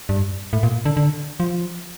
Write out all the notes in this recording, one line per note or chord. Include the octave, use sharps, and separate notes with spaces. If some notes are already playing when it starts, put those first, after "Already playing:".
G2
A2
A#2
D3
D3
F3